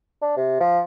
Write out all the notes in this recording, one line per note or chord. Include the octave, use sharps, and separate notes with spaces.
D4
C3
F3